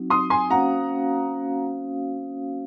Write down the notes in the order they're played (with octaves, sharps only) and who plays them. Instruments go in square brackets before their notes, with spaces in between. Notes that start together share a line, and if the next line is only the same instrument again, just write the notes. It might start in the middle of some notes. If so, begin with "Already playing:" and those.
Already playing: [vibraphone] F#3 C4 D#4 F#4
[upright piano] C6 D#6
G#5 C6
[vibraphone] A#3 C#4 F#4 C5 F5 [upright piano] F#5 A#5